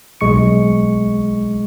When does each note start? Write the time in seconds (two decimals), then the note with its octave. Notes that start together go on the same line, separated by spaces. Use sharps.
0.21 B1 G#3 C#6 C#7